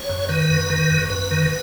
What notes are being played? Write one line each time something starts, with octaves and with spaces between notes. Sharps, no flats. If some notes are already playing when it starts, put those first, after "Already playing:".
Already playing: C#5
F#2
D#3 B4
F#2
D#3
F#2
F#2 B4
D#3